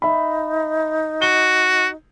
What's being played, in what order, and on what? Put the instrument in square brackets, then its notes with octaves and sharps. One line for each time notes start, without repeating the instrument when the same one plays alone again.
[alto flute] D#4 [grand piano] E5 B5
[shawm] F#4 [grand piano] G7